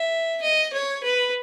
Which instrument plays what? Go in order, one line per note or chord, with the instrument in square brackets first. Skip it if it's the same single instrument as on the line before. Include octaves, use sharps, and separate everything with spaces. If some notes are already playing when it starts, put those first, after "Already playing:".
Already playing: [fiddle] E5
D#5
C#5
B4